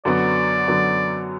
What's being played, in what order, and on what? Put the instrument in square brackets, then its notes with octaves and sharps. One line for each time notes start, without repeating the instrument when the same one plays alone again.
[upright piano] F#2 D3 F#3 B3 [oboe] D5
[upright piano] F#2 D3 F#3 B3